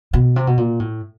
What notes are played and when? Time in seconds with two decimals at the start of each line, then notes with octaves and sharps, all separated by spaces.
0.13 B2
0.36 C3
0.47 B2
0.57 A#2
0.80 A2